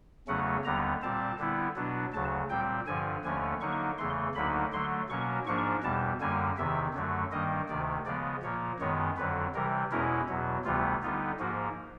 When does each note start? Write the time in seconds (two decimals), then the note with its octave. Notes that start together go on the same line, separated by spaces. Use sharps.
0.28 E2 C#3 F#3 A3 C#4 F#5
0.64 D#2 D3 G3 B3 A#5
1.02 A#2 G3 C4 A5
1.39 D3 G3 B3 E4
1.76 B2 F#3 B3 D4
2.13 D2 C#3 F#3 A5
2.50 A#2 G3 C4 G5
2.87 G2 D3 F3 G#5
3.25 D#2 D3 F3 A3 C#4 G#5
3.61 D3 F#3 A#3 D#4 C#6
3.98 E2 C#3 E3 A3 C6
4.35 D2 D3 F#3 A#3 D#4 B5
4.73 D3 F#3 A3 C6
5.09 B2 F#3 A#3 C#4 C#6
5.46 G#2 F3 A#3 D4 C#6
5.83 E2 B2 G3 A5
6.21 F#2 D3 G3 A#3 G#5
6.58 E2 C3 D#3 E5
6.94 F#2 D3 F#3 A3
7.31 G2 D#3 G3 A#3 D#5
7.69 D2 C3 D#3 D5
8.06 C#3 F3 G#3 B3 D5
8.43 A#2 F3 A#3 C#5
8.80 F#2 D#3 G#3 B3 C#5
9.17 F2 D3 F#3 B4
9.54 C3 E3 G3 A#4
9.91 E2 B2 G#3 C#4 E4 A#4
10.29 E2 B2 F#3
10.65 D2 C3 E3 G3 B3 F4
11.02 D3 G3 B3 D#4 F4
11.40 G#2 F3 A#3 F#4